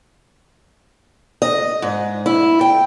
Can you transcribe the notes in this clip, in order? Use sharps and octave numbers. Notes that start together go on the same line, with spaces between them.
D#5
G#2
E4
G5